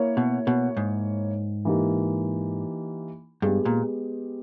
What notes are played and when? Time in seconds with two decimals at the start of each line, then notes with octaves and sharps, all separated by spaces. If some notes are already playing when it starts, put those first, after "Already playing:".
Already playing: A#3 E4 A#4 C#5
0.17 B2
0.47 B2
0.77 G#2
1.65 E3 A#3 D#4 G4
3.42 G2 G#3 B3 G4
3.65 A#2